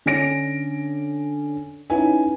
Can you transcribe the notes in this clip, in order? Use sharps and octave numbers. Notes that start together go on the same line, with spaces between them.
D3 C#4 D4 A#6 D7
C#4 D#4 E4 B4 G#5